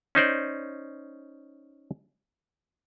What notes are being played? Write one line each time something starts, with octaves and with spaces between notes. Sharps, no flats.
C#4 D#4 C5 D5